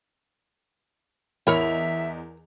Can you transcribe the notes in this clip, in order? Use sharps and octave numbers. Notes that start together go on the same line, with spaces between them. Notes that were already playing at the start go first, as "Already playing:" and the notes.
E2 E4 A#4 C#5 D#5 E5 F7